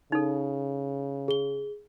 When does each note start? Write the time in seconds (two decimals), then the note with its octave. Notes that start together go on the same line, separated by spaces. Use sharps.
0.12 C#3 D#4 A4
1.28 G#4 G7